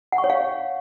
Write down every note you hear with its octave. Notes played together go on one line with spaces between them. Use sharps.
F#5
C#6
C#5
F5